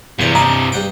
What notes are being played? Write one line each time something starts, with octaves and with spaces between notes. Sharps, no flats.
E2 G2 C3 F#5
D#5 A5 A#5
G2 F#5 G5